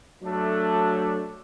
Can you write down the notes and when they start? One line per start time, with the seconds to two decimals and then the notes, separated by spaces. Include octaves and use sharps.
0.22 F#3 A3 D4